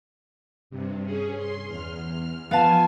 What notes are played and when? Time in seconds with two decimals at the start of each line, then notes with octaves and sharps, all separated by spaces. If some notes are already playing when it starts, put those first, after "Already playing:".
0.70 G2 C3
1.03 C#4 G#4
1.37 C6
1.67 E2 F6
2.51 F3 B3 F4 F5 G#5 A5